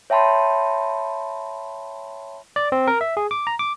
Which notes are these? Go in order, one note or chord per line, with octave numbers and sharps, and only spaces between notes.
C#5 E5 G5 A5 B5 C6
D5
C4
A#4
E5
G#4
D6
A#5
D6